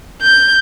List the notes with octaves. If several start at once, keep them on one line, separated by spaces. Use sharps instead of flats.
G6